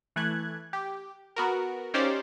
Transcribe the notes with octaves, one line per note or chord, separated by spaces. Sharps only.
E3 A3 F#6 G#6
G4
B3 F#4 A#4
C#4 D#4 G4 C5 D5 F5